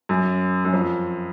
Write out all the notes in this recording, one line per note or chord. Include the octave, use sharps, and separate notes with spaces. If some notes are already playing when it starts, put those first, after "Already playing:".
F#2
F#2
F2